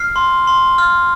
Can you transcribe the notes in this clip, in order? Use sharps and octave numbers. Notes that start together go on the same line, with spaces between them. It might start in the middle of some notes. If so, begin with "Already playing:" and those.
Already playing: F6 C7
C6
C6
F6